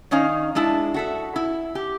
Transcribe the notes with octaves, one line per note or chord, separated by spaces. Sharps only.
D#3 C#4 D#4 F5
G#3 D4 E4 A5
F#4 A4 E5
E4
G4